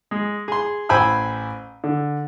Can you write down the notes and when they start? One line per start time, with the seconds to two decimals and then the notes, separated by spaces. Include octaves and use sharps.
0.11 G#3
0.48 G#4 C6
0.89 A1 C5 G5 G#5 B5 E6
1.84 D3